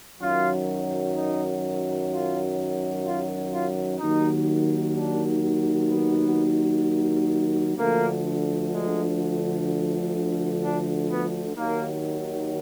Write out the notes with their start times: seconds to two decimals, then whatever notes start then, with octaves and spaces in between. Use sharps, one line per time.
0.20 F#2 D#3 F#3 F4
1.15 D#4
2.09 F4
3.03 F4
3.50 F4
3.98 D#2 D#3 F#3 D#4
4.92 D4
5.87 B3
7.76 D2 D3 F3 A#3
8.72 G#3
10.60 D4
11.07 B3
11.55 D#2 D#3 F#3 A#3